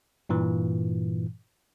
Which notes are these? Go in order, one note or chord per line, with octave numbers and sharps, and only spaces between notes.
G2 A#2 E3